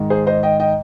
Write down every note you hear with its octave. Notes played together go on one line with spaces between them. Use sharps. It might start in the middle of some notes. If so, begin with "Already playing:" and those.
Already playing: G#2 D#3 G#3
G#4 C5
C5 D#5
D#5 G5
D#5 G5